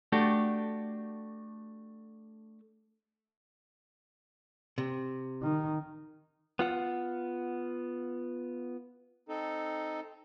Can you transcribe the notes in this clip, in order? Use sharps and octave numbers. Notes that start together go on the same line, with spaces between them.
A3 D4 F#4 G4
C3
D#3
B3 F4 F#5
C4 D#4 A4